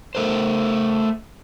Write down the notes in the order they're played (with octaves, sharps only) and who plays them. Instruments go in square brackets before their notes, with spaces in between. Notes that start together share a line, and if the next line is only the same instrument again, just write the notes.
[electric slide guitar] A3 A#4 C5